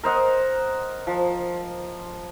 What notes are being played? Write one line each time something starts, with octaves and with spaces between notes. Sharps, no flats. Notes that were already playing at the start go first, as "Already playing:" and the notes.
A#4 C5 D#5 F#5
F3